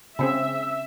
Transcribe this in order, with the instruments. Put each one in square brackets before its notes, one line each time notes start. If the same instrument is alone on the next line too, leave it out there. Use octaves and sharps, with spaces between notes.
[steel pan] C#3 C4 G#4 [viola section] E5